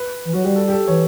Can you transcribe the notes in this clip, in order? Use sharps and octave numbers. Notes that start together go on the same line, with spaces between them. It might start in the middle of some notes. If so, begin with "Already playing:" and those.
Already playing: B4
E3
F#3 F#4
G3 G4
A4
G4
A4
E3 C#5